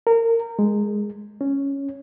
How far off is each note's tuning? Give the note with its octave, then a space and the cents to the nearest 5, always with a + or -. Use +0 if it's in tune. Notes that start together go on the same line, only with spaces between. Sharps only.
A#4 -25
G#3 -5
C#4 +0